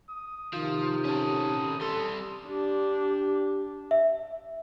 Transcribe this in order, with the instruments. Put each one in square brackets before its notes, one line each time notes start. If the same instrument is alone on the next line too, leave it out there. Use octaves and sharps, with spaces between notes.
[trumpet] D#6
[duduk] C3 [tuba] D#3 [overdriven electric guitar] F3
[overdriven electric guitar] C#4 A4
[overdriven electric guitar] G3 C6 [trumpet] A4
[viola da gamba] D4 [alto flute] G4
[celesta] E5